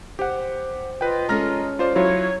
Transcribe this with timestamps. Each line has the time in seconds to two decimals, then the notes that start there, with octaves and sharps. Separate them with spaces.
0.19 G4 C5 F#5
1.01 F4 B4 D#5 G5
1.29 G#3 C#4 A4 A#5 F6 A#6
1.79 F4 C5 D5
1.96 F#3 E4 F4 C#5